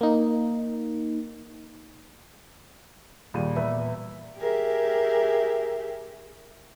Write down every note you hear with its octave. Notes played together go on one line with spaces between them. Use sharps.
A#3 D#4
D#2 A#2 G3 G#4 D#7
E2 B4 E5
G4 G#4 A#4 E5